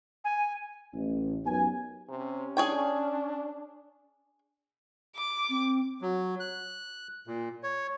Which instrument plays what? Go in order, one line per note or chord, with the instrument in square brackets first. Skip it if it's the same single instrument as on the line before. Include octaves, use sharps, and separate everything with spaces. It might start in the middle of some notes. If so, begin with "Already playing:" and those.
[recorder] G#5
[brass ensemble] A1
F#2 B3 C#4 D#4 G4 G#5
[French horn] C3 [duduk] C#4
[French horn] D4 [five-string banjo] G#4 C#5 G5
[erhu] D6
[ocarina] C4
[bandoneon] F#3
F#6
A#2
C#5